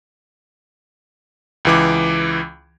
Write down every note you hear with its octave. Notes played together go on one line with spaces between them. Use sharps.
C#2 E3 D6